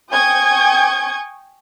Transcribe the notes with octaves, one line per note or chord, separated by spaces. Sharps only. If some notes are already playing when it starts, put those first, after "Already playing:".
G5 G#5 C#6 D#6 G6 G#6